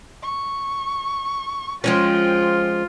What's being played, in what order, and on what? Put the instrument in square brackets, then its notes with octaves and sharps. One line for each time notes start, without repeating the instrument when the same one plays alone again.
[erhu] C#6
[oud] F3 G#3 C#4 [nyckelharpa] F4 [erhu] G5